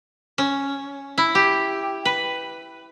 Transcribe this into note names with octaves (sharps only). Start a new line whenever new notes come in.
C#4
E4
G4
B4